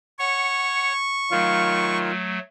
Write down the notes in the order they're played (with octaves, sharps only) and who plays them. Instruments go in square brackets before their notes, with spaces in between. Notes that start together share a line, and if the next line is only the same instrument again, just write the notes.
[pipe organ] C#5 F#5 [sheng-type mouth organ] C#6
[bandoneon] D#3 F4 F5 [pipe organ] F#3 A3